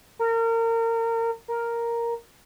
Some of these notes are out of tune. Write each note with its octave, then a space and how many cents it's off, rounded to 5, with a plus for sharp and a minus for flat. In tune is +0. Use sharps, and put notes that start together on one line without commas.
A#4 -30
A#4 +0